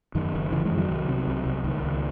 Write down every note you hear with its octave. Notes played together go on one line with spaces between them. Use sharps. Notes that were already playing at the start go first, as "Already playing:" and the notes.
F#2 D#3
F#1
C#3 E3
E3 G#3
F#2
D#3 F#3
C2
C3
C2
C2
C#2 D#3
C#2